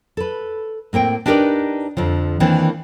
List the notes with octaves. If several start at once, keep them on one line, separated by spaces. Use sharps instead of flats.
A4 B4
A2 A#3 C4 G5
D4 D#4 G4 A#4 B4 D5
F2 D3 F3
D#3 E3 A#3 C4 D4